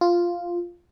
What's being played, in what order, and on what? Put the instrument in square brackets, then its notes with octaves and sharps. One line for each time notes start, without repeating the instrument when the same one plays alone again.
[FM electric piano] F4